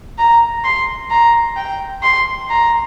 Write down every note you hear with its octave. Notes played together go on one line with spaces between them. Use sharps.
A#5
C6
A#5
G5
C6
A#5